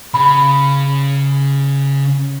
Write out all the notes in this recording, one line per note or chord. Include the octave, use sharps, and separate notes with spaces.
C#3 B5